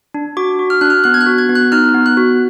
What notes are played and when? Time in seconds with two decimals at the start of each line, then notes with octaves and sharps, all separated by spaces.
0.14 D4
0.37 F#4 D6
0.59 F#4
0.70 F6
0.81 D4 F#6
0.90 F6
1.04 B3 F#6
1.14 G#6
1.21 F#6
1.26 F#4
1.38 G#6
1.49 B3
1.55 F#6
1.72 D#4 F6
1.95 B3
2.06 F#6
2.17 F#4